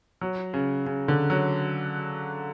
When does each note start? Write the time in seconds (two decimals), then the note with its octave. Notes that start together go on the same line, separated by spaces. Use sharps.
0.21 F#3
0.54 C#3
0.86 C#3
1.08 D3
1.30 F#3